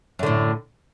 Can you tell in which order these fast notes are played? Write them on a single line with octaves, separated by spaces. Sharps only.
F#2 D3 A2